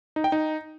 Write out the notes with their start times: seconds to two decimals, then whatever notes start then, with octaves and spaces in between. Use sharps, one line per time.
0.16 D#4
0.24 G5
0.32 D#4